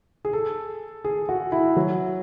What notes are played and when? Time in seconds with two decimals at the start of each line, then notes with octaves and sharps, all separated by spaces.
0.25 G#4
0.33 A4
1.04 G#4
1.29 F#4
1.52 E4
1.76 F#3